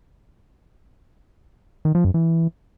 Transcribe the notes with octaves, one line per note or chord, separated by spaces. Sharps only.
D#3
F3
F#2
E3